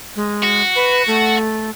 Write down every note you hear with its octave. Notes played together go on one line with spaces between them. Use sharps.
G#3
F#4
B4
A3